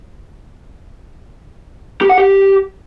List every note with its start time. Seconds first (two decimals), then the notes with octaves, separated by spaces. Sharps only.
2.01 G4
2.10 F#5
2.18 G4